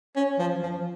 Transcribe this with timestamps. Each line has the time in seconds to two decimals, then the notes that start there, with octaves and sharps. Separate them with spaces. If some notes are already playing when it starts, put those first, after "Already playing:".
0.16 C#4
0.39 F3
0.63 F3